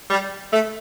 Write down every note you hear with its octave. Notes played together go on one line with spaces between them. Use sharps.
G3
A3